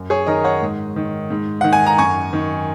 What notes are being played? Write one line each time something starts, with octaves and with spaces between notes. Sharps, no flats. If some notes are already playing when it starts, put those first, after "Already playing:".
Already playing: F#2
G#4 C#5
D#3 A#4 D#5
C#5 F#5
G#2
D#3
G#2
D#3 F#5
G#5
A#5
F#2 G#5 C#6
D#3